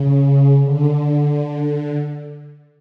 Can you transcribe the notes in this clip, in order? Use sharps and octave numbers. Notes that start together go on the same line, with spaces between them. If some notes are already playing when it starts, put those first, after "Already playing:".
Already playing: C#3
D3